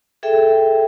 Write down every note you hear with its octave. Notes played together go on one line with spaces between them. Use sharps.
G#4 A4 E5 G5